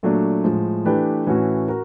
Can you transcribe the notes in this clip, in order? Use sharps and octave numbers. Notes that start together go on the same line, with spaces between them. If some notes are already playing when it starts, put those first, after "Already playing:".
A#2 F#3 A3 D4
A2 F3 G#3
E3 A3 D4 G4 B4
A2 E3 A3 C#4 F#4
F#4 A#4